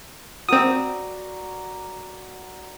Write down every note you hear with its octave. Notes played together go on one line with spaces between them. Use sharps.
C4 F#4 A#4 D5 D#6